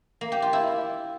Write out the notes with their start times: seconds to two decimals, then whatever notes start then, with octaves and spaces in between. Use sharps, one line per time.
0.21 A#3
0.32 G4
0.42 F4
0.53 E4